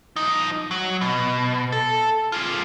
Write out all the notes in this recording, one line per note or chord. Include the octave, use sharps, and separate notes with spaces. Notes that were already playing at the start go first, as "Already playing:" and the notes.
F3 D#4
F#3
B2
A4
F4 G#4